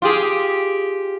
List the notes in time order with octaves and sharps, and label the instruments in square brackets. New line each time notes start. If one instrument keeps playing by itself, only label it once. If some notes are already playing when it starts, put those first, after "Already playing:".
[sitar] F4 G4 G#4